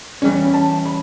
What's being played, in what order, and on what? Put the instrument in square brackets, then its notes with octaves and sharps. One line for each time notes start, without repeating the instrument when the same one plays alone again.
[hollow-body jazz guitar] E3 G3 C#4
A5
B5